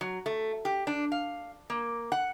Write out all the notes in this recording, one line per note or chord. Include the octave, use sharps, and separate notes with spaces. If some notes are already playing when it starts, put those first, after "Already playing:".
F#3
A3
G4
D4
F5
A#3
F#5